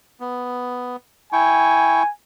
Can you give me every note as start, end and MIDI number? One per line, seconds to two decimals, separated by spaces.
0.20 0.96 59
1.33 2.03 64
1.33 2.03 79
1.33 2.11 80
1.33 2.03 85